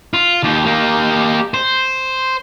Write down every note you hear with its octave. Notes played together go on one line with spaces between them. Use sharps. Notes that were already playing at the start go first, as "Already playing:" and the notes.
F4
D#2 G4
A#3 G4
C5